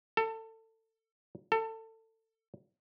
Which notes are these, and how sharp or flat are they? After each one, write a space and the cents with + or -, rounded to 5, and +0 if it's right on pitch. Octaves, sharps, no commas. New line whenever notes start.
A4 +25
A4 +25